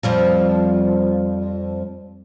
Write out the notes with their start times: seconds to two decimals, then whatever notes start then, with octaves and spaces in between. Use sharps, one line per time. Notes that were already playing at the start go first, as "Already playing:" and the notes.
0.03 F2 F3 G3